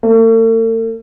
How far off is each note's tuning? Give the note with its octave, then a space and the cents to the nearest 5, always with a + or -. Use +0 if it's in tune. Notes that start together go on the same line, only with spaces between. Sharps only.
A3 +45